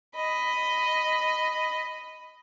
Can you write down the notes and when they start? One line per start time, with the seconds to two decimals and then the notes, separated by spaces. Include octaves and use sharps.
0.16 D#5 B5